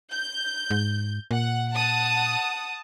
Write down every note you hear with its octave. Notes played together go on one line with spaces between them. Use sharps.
G6
G#2
A#2 F#5
F#5 A5 D#6